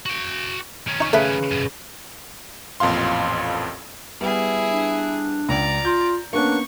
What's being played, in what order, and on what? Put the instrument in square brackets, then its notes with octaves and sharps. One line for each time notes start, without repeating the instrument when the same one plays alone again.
[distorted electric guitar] F#4 G5
D#3 C#4
[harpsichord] D#4 C#6
[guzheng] C#3 B4 [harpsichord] A3
[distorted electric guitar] F#2 B2
[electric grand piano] A1 F2 A#2 F5 C6
[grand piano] G3 B3 [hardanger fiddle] E4 G#4
[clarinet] D4
[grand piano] C#2 [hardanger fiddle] D5 A#5
[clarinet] F4 [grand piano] G6
[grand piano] A#3 B3 C#4 [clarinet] D4 [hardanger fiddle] C#6